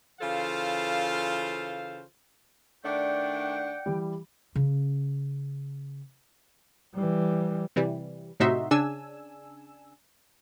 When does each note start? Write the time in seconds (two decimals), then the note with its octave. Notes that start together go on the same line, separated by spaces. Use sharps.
0.21 C#3 E3 F4 A4 C5 F5
2.84 D#3 A3 D4 D5 F#5 G5
3.86 E3 G3
4.55 C#3 C#4
6.95 E3 G3
7.76 C3 E3 G3
8.40 A2 C3 D#4 F#4 E5 C6
8.71 C#3 D4 G#5 E6